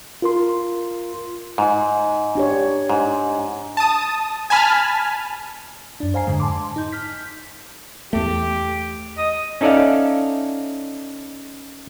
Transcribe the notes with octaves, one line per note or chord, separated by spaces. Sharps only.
F4 A#4 C6
G#2
D4 G4 C#5
G#2
A5 D#6
G#5 A5 B5 F6
F#2 D4
C5 F5 G#5 A#5 C7
F2 G#2 D3 G#3
G#5 A5 C6 D6
D#4 G6
F6 G6 B6
E2 A3 G4
D#5
C#4 D#4 A4 D5 E5 F5